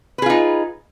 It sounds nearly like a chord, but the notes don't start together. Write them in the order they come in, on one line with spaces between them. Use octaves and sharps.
B4 G#4 F4 D#4